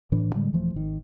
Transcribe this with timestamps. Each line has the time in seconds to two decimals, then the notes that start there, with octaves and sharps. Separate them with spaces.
0.12 A1 A2 E3 D4
0.34 A2 D3 G3 G#3
0.53 D#1 E3 F3 A3
0.74 G#1 D#3